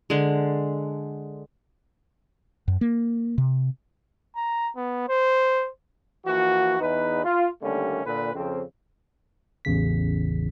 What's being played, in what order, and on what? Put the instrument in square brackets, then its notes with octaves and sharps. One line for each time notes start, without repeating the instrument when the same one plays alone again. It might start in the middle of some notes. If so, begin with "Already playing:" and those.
[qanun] D3 G#3
[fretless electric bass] F#2
A#3
C3
[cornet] A#5
B3
C5
[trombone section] E3 F3 A#3 F#4
E2 D#4 B4
F4
D#2 D3 G3 A3 A#3 C#4
A#2 D3 B4
F2 C#3 C4
[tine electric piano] A1 E2 C#3 B6